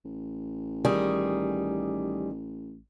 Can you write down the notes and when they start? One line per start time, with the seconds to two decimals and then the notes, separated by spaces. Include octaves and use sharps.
0.05 A1
0.85 D#3 G3 G#4